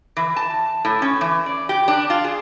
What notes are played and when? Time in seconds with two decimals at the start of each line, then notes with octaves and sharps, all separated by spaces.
0.17 E3
0.36 A5
0.85 A2
1.02 C#4
1.21 E3
1.46 D5
1.69 G4
1.88 D4
2.10 F4
2.24 G#4